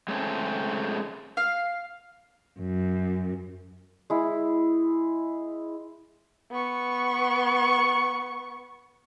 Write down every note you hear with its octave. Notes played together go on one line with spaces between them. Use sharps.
G#3 A3 C4 C#4
F5
F#2
G#3 E4
B3 C#6